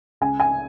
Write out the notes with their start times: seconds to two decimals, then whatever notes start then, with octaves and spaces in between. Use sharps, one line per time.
0.21 C#2 G#5
0.40 G#5